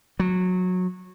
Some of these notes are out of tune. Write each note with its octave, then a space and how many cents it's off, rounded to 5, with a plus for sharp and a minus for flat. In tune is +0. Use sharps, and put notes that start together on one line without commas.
F#3 -20